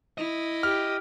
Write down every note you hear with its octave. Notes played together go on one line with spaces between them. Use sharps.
E4 D#5
G4 F6